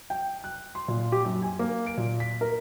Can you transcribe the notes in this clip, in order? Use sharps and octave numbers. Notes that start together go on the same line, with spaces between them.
G5
F#6
C6
A#2
G4
F#2
G#5
A#3
D7
A#2
B6
A#4